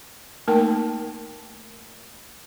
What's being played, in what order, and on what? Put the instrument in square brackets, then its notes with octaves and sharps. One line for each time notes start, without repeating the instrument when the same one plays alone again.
[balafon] A3 A#3 D#4 A#4 G5 A5